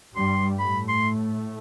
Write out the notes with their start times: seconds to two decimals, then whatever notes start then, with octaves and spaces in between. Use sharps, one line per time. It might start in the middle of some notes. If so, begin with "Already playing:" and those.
0.15 G2 G3 C6
0.59 A2 A3 B5
0.89 C6